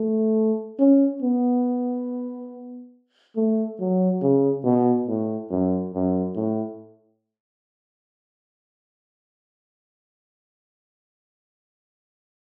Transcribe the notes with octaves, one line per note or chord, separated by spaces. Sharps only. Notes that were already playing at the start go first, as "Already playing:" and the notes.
Already playing: A3
C#4
B3
A3
F#3
C#3
B2
A2
F#2
F#2
A2